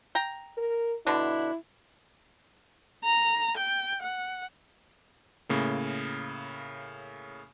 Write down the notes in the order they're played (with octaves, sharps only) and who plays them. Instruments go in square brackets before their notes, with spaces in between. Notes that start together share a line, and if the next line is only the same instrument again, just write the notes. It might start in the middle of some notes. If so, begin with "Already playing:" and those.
[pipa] G5 A#5
[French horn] A#4
[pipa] B2 D3 D4 [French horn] E4
[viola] A#5
G5
F#5
[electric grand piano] A2 C#3 A#3